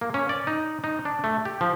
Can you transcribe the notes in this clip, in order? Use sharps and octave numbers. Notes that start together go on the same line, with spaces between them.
A#3
C#4
D5
D#4
D#4
D4
A3
G4
F3